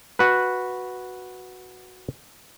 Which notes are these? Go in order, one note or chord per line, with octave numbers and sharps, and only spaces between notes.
F#4 B4